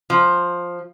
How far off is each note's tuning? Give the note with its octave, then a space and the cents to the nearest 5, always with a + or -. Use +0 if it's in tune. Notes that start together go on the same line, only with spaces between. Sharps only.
F3 +5